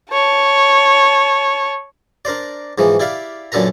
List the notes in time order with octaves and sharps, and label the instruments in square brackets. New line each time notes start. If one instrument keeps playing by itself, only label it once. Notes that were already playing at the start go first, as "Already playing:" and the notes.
[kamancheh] C#5 A5
[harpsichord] D4 A#4 C5 D5
G#2 E3 F3
E4 G4 D5 F5
F#2 A#2 D3 A4 B4 A#5